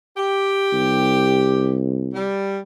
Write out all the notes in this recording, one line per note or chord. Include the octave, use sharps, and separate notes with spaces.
G4
C2
G3